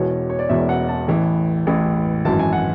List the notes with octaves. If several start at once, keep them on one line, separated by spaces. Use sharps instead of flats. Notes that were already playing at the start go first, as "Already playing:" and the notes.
Already playing: E1 E2 B2 C#5
C#5
D5
E1 E2 B2 E5
F#5
A5
A1 A2 E3
A1 A2 E3
G#1 F#2 E3 A5
G#5
F#5